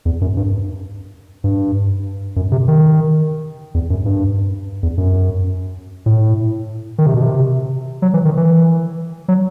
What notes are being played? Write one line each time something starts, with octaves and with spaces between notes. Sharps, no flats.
E2
F#2
G2
G2
F#2
C3
D#3
E2
F#2
G2
E2
F#2
A2
D#3
C3
B2
C3
F#3
E3
D#3
E3
F#3